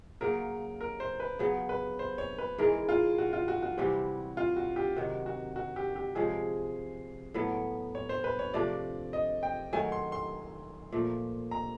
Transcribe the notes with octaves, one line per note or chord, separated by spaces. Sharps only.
C#3 F#3 A#3 A#4
A#4
C5
B4
C#3 F#3 B3
B4
C5
C#5
B4
G#2 E3 G#3 A#4
F4
F#4
F4
F#4
F#4
C3 E3 G3 C4 F#4
F4
F#4
G4
C3 D#3 F#3 F#4
F#4
F#4
G4
G4
C3 F3 G#3 C#4 G#4
A2 F#3 B3
C#5
C5
B4
C#5
C3 F3 A3 D4 D5
D#5
G5
D#3 F#3 A3 G#5
C6
C6
A#2 F3 A3
A#5